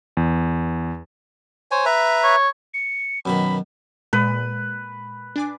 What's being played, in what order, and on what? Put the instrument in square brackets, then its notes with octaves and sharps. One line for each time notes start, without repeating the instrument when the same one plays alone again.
[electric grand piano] E2
[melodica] C5 C#5 G#5
B4 E5 A#5
[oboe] C#5
[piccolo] C#7
[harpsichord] F#2 B2 D#3 [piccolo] B5
[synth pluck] A#2 G#3 [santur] B4
[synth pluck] D4 G#5 D6